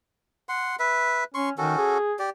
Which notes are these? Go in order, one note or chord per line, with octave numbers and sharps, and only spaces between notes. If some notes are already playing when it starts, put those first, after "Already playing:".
F#5 C6
B4 E5
C#4 C6 C#6
D#3 C#4 F#4 A4
G#4
G4 D5